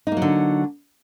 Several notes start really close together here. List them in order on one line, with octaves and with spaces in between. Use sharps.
D#4 A#3 F#3 D3